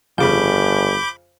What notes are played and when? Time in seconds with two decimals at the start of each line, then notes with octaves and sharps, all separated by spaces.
0.18 G1 F2 C#3 B5 D6 G6